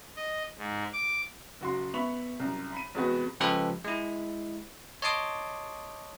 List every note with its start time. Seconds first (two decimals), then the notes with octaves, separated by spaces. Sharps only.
0.16 D#5
0.58 G#2
0.93 D6
1.61 F#1 F#4 C6
1.94 B3 E5 B5 C#6 F7
2.40 C2 F#2
2.73 B5 D#7
2.95 E2 C3 G#3 B3 F#4 B4
3.40 C#3 F3 G#3 G4 A4 B4
3.84 G#3 E4
5.02 C#5 D#5 A5 C6 D6 D#6